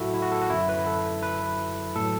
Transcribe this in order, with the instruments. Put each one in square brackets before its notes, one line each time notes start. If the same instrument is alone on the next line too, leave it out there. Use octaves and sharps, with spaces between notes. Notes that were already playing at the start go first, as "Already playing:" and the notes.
Already playing: [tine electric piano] A2 F#3 E4 F#4 A4 E5 F#5
E4
F#4
A4
F#4
F#2 D3 F#3 E4
B4
A4
B4
A2 F#3 A4